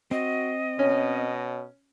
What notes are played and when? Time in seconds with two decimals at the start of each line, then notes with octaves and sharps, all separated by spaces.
0.11 C4 F#4 D#5
0.79 B2 C#4